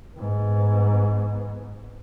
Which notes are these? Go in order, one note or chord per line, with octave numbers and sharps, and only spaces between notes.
G#2 B3